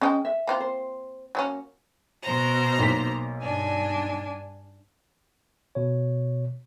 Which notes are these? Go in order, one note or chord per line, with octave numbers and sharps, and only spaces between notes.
G#3 C#4 A4 D#5 G5
E5
A#3 C4 F4
C5
F#3 A#3 C#4
B2 C5 A#5
B1 A#3 B6
G2 D4 G#5
B2 C#5